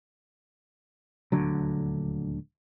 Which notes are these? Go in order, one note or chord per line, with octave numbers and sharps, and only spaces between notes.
D#1 D2 D3 F#3